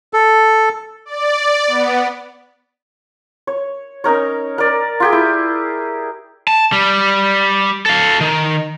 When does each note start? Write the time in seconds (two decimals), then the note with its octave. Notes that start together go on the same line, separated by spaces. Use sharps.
0.13 A4
1.05 D5
1.67 B3
3.47 C#5
4.04 C#4 D#4 A#4 C#5
4.58 A#4 D5
5.00 F4 G4 G#4
5.12 E4
6.48 A5
6.72 G3
7.86 A4 F5
8.21 D#3